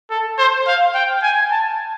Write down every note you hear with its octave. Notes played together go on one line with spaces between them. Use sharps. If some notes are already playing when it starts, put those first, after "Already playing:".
A4
C5
F5
G5
G#5
A5